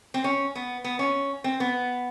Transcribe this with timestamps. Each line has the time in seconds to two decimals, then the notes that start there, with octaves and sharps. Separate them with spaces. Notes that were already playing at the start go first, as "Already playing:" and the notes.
0.14 C4
0.24 C#4
0.55 B3
0.84 B3
0.99 C#4
1.44 C4
1.60 B3